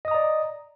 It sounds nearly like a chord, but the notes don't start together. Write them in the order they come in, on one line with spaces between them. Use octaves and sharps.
D#5 D#6 A#5 D5